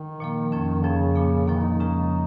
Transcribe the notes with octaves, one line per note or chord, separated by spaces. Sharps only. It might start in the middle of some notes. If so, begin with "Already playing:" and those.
Already playing: D#3
A#2 F3 A#3
F2 F3 C#4
F2 C#3 F3 C#4
A#2 F3 A#3
A#2 D#3 F3 A#3
D#4
D#4
F2 C#3 F3 G#3 C#4